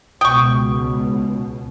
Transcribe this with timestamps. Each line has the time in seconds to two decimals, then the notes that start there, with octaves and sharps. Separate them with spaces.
0.21 C#2 B2 G5 C#6 D#6